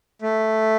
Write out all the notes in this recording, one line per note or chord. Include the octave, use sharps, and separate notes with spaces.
A3